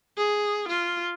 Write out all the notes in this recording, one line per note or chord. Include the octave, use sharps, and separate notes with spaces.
G#4
F4